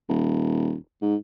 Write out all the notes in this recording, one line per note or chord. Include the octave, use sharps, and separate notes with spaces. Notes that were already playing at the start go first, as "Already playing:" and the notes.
D#1
G#2